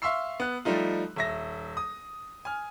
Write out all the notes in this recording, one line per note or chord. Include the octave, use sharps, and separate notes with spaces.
E5 F5 C6 C#6 E6 C7
B3 F#6
F3 G3 A3 D#4 F4
D#1 E5 A#6
D#6
G#5 F6